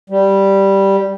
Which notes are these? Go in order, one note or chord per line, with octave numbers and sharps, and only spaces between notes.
G3